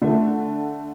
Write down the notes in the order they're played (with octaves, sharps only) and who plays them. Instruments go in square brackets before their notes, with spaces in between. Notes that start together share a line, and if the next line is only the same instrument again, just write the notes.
[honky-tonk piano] D3 A3